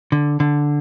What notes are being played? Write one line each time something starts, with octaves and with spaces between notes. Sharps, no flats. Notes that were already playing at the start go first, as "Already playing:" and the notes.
D3
D3